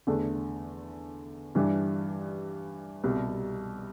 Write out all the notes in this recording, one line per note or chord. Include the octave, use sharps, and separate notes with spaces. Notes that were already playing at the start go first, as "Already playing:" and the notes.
E2 D3 A3 D4
G2 E3 G3 D4 G4
C2 B2 G3